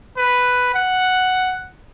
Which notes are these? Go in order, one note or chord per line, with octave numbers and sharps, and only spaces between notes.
B4
F#5